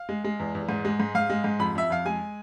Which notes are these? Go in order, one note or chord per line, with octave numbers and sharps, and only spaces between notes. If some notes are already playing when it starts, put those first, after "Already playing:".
Already playing: F5
G#3
G#3
E2
E2
G#2
G#3
G#2
G#2 F5
G#3
G#2
F2 B5
F2 E5
F2 F5
G#3 G#5